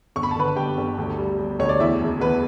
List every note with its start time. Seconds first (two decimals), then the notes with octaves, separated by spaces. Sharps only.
0.16 G1 C#6
0.23 B5
0.31 A5
0.36 D3 B4 B5
0.56 G1 G4 G5
0.77 G1
0.98 D2
1.18 G3
1.39 G3
1.59 D2 C#5
1.69 D5
1.80 E2 E4 E5
2.01 F#1
2.20 E2 B4